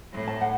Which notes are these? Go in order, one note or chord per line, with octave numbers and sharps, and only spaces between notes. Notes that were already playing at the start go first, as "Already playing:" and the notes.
A2
A5
F#5